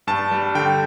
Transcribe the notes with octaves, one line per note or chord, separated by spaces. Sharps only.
G2 A5
G3
D3 G5